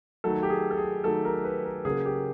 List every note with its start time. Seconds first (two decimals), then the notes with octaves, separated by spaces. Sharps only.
0.24 D#3 F#3 A3 A4
0.43 G4
0.50 G#4
0.71 A4
0.77 G#4
1.04 D#3 F#3 A3 A4
1.25 A#4
1.44 B4
1.65 A#4
1.85 C#3 F#3 A#3 G#4
2.05 G4